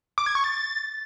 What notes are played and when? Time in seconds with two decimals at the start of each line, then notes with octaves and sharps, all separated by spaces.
0.18 D6
0.26 G#6
0.35 C#6
0.44 A6